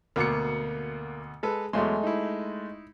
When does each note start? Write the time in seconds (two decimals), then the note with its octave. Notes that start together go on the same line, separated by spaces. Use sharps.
0.16 D2 B2 A#3 D6 C#7
1.43 G#3 A4 B4
1.73 E2 F#3 G#3 A3 C6
2.03 D#4 E4